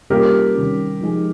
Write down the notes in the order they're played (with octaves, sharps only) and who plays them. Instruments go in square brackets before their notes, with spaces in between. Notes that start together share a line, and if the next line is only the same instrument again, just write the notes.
[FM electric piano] C3 G3 A#3 C#4 F4 [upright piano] G4 A#4
[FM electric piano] C3 D#3 G3 C#4
F3 G#3 D#4 G#4